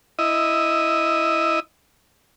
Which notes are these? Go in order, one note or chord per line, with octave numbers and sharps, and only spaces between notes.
E4 D#5